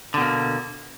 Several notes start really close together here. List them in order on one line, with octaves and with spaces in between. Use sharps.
D3 B2 A#3